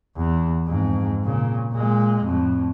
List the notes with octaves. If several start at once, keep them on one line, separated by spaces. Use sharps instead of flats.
E2
F2 G#2
A#2 C#3
A#2 G#3
F2 A2